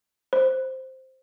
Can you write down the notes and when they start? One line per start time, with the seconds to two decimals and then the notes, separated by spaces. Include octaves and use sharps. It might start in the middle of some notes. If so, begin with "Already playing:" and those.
0.33 C5